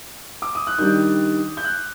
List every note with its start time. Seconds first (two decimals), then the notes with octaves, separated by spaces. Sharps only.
0.42 D6
0.55 D#6
0.67 F#6
0.79 D#3 G3 D4 G6
1.57 G6
1.64 F#6